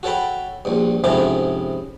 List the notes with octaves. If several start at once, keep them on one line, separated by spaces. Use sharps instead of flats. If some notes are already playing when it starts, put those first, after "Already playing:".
F#4 A4 C#5 G5 B5
A#1 G2
F2 G#2 C3 C#4 E4 D6